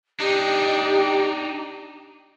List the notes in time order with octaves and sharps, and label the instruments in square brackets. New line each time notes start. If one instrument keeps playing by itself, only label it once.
[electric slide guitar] D4 D#4 [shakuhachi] G4